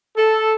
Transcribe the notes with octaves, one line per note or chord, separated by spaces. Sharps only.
A4